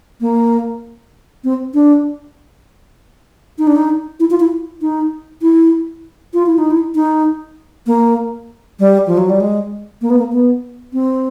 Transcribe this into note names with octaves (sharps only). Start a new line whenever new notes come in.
A#3
C4
D4
D#4
D4
D#4
E4
F4
E4
D#4
E4
F4
E4
D#4
E4
D#4
A#3
G3
F3
F#3
G3
G#3
A#3
B3
A#3
B3
C4